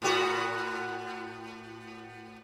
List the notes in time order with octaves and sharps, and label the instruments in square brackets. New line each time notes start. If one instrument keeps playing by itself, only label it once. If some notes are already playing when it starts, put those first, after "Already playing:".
[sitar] A2 B3 F#4